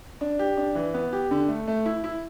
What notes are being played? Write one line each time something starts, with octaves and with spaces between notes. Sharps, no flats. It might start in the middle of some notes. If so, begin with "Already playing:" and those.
D4
G4
D4
E3
B3
G4
D3
A3
A3
E4
E4